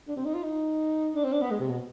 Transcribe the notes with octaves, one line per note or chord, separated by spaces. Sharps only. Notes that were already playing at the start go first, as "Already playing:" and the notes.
D4
C4
D#4
F4
D#4
D4
C4
D4
B3
G#3
C3
B2